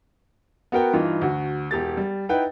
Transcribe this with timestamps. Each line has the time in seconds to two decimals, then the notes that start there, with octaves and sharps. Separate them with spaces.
0.72 B3 F#4 A#4 G5
0.93 G2 E3 D#4 F4
1.22 D2 F#4
1.71 E1 G4 A6
1.97 G3
2.29 D#4 E4 B4 F#5 G5